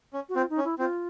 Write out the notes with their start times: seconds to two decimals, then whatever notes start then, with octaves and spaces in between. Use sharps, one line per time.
0.13 C#4
0.29 F#4
0.36 C4 F4
0.50 D#4
0.58 C#4
0.65 E4
0.79 C4 F4